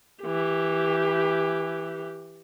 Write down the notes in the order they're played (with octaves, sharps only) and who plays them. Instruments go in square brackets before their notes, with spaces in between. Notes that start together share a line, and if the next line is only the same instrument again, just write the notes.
[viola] E3 G4